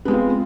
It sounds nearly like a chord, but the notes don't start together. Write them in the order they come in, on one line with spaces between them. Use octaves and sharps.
B3 G#3 C4 F4